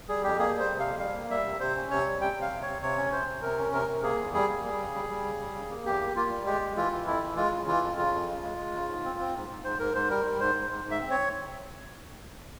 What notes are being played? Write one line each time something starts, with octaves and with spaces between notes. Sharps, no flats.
G3 G#4
F2 G4
A#3 G#4
G3
C5
C3
F5
F2
G3 F5
A#3
G3 E5
C3
C3 C5
C#4
C3 C#5
G3
C3 G5
C3
F5
C3
C3 C#5
C3 C#5
C#4
C3 C5
C3
C3 A#4
C#4
C3 A#4
C3
A#3 G#4
E2
G3 G#4
A#3
G3
C#3
G3
G3
C#3
G3
C#3
A#3
E2 G4
A#3
A#3 F4
G3
G#3 G4
G#3
E3 F4
E3
F2 E4
E3
G#3 F4
C#3
E3 F4
F2
C#3 F4
F2
C#3
G#3
G#3
C#3
G#2
C4
C4
G#2
G#2
G#2 C5
G#2 A#4
G#2 C5
G3 A#4
G3
G#2 C5
G#2
G#2
G#2
E5
C4
C#5